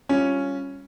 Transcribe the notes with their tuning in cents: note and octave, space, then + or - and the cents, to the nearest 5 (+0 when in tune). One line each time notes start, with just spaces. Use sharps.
G3 -5 C#4 +0 F4 +0